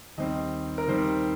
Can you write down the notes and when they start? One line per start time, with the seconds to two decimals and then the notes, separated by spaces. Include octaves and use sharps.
0.18 D#2 D#3 G3 C4 D#5
0.78 A#4
0.88 D#2 D#3 G3 C4 C5